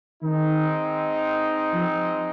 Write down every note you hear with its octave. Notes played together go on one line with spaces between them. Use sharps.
D#3 G#3 C4 D#4
F3